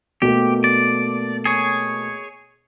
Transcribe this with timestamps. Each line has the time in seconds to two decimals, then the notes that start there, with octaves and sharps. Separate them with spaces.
0.22 B2 A3 A#3 G4
0.64 D5
1.45 G#4 C#5